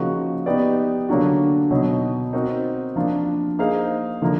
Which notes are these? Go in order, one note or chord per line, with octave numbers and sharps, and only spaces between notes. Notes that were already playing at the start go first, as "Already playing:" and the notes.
Already playing: C#3 F3 A#3 D#4 F#4
B3 D#4 G4 B4 D5
D3 F#3 A#3 D4 F#4
B2 F#3 B3 D#4
C4 D#4 F#4 A#4
F3 A#3 D4 F4
A#3 D#4 G#4 C5 F5
D3 F3 A#3